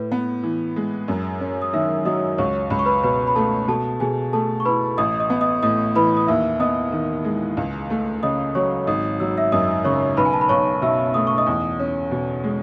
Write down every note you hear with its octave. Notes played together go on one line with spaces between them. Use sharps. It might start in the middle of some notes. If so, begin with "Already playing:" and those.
Already playing: A2 B4
B3
E3
G#3
F#2
C#4
D#6
D#3 E5 E6
F#3 D#5 D#6
C#2 C#5 C#6
C#2 B5
C#6
B4 B5
B2 B4 B5
B5
A3 A4 A5
B2 A4 A5
B2 G#4 G#5
A3 A4 A5
C#6
E4 B4 B5
A1 D#5 D#6
D#5 D#6
B3
D#5 D#6
A2 D#5 D#6
E3 B4 B5
D#6
D#2 E5 E6
B3 D#5 D#6
D#3
G#3
C#2
A3
C#3 D#5 D#6
F#3 C#5 C#6
G#1 D#5 D#6
F#3 E6
E5 E6
F#2 D#5 D#6
C#3 C#5 C#6
B1 B4 B5
G#5
A5
B5
B1 C#5 C#6
B2 E5 E6
A3 D#6
C#6
D#5 D#6
E2
C#4
B2
G#3